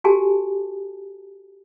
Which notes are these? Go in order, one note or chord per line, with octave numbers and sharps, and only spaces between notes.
F#4 G4 A4 G#5 A5